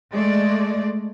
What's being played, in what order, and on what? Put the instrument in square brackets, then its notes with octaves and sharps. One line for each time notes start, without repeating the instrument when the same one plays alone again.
[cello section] G#3 A3 D5